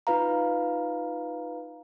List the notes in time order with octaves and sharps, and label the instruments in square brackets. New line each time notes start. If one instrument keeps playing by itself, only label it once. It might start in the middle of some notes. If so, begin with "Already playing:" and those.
[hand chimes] D#4 F4 B4 F5 A#5